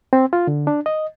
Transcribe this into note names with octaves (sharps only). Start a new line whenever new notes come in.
C4
F4
D3
D4
D#5